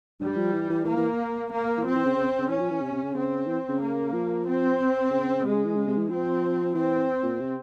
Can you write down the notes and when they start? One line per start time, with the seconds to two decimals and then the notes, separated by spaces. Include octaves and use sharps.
0.20 G2 G3
0.37 F3
0.53 E3
0.70 E3
0.85 E3 A#3
0.97 E3
1.51 A#3
1.78 E3
1.84 F3 C4
1.95 E3
2.05 C#3
2.16 C#3
2.39 C#3
2.49 E3 C#4
2.60 F3
2.71 E3
2.81 C3
2.93 C3
3.03 C#3
3.15 C#3 C4
3.47 E3
3.69 C#3
3.80 A#3
4.13 F3
4.46 C4
5.11 C#3
5.43 C3 G#3
5.54 C#3
5.65 E3
5.76 C#3
5.87 C3
5.98 E3
6.09 F3 C4
6.74 E3 C4
7.23 A#2
7.40 C3